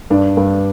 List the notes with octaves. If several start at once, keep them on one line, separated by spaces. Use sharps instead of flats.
G2 D4
G2